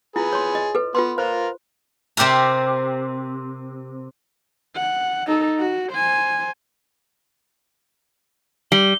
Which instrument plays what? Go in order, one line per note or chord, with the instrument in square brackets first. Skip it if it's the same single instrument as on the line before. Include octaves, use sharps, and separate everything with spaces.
[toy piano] E4 F4 [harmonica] G#4 B4
[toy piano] C#5 C6
D#5
A4 B4
[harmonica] B3 [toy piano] F4 B4 C6
[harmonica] F4 A#4 [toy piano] C5
[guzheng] C3 C4 G4 A#4 A#5
[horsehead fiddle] F#5
D#4 A4
F#4
C5 G#5
[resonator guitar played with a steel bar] G3 [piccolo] G7